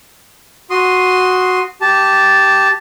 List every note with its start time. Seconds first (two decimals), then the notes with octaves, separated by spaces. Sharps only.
0.70 F#4 C6 D#6
1.81 G4 A5